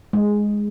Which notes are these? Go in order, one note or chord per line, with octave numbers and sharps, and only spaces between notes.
G#3